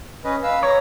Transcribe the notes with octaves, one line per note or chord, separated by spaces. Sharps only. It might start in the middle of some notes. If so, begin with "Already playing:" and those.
C#4 B4 D#5
B4 F5 E6
C#5 A#5